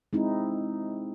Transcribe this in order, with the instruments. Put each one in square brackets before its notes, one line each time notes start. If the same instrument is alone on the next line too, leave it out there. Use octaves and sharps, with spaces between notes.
[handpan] G#3 C4 D#4 E4